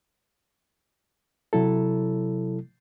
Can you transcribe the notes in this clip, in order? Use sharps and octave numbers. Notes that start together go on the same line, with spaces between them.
C3 F#3 E4 A4